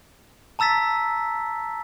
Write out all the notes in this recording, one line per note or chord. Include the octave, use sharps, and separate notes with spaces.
A5 A#5 E6 A6 B6